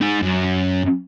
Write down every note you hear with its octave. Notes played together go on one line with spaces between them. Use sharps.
D#4 G#4
F#2